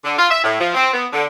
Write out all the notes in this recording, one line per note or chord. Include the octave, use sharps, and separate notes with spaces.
D3
F4
E5
A2
F3
C4
B3
D3